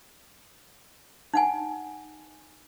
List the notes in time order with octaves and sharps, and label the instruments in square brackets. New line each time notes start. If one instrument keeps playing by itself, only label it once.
[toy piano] D#4 F#5 G#5